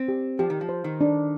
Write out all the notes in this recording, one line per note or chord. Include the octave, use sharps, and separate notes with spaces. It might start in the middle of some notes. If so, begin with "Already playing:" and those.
Already playing: C4
G4
F3 G4
D#3
F3
C5
D#3
D4